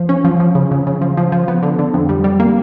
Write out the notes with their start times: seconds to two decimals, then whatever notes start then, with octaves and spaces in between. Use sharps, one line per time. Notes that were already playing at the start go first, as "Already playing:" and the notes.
Already playing: F3
0.09 C#4
0.25 F3
0.40 F3
0.55 C#3
0.71 C#3
0.87 C#3
1.01 F3
1.17 F3
1.32 F3
1.48 B3
1.63 D3
1.79 D3
1.94 F2
2.09 G3
2.24 G3
2.40 A#3